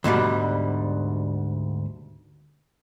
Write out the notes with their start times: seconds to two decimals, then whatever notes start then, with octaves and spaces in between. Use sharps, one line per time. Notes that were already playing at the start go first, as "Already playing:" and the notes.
0.04 D2 G#2 B2 G3